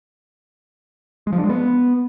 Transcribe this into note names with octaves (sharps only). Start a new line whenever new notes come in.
G#3
F3
D4
G#3
B3